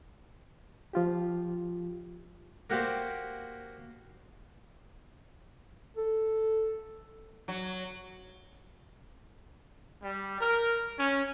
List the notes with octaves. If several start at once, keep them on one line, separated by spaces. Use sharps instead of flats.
F3 F4 G4
A#3 F#4 G4 C5 D5
A4
F#3
G3
A#4
C#4